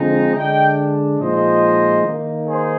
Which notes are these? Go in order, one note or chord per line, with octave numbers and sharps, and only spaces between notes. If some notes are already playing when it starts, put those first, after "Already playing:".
Already playing: D3 F3 G#3 C4 D#4
D3 G#3 D4 D#5 G5
A#2 F3 G#3 D#4 C5 D#5
D#3 A#3 D#4
G#4 C5